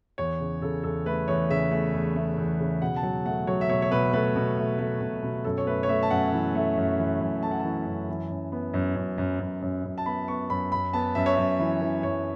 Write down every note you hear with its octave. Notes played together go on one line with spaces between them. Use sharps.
E2 C#5
C#3
C#3 A4
E2 A4
A3 B4
E2 C#5
C#3 E5
A3
E2
A3
E2
C#3
B2 F#5
A5
F#3 F#5
A3 F#5
F#3 C#5
E5
B2 C#5
C#5
B2 B4
A3 B4
B2
A3
A3
B2
B2
F#2 A4
C#5
A3 B4
C#5
A3 E5
A5
F#2 F#5
E3
A3
F#2
E3
F#2
A3 A5
F#5
E3 A5
F#2
E3
F#2
B3
F#2
F#2
F#2
F#2
F#2
F#2
A5
B3 B5
B3 C#6
F#2 B5
F#2 B5
B3 A5
F#2 E5
C#5
F#2 E5
E3
E3
F#2 C#5